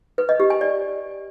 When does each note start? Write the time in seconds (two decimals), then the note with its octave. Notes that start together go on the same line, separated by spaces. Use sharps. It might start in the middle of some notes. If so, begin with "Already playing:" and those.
0.18 B4
0.29 D#5
0.40 G4
0.50 G#5
0.61 D5